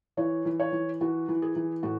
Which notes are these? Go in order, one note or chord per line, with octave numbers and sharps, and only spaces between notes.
E3 C#5
E3
C#5
E3
E3 F#4
E3
G#4
E3
A2 F#4